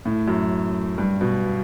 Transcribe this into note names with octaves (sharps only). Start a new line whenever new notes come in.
A2
F#2
G2
B2